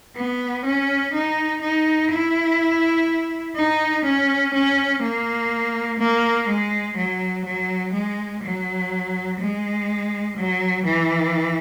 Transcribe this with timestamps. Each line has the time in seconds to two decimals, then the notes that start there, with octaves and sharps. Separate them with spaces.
0.16 B3
0.65 C#4
1.14 D#4
1.62 D#4
2.11 E4
3.56 D#4
4.05 C#4
4.54 C#4
5.03 A#3
5.99 A#3
6.48 G#3
6.97 F#3
7.45 F#3
7.93 G#3
8.43 F#3
9.40 G#3
10.37 F#3
10.85 E3